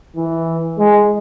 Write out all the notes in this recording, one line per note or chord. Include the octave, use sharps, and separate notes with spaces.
E3
G#3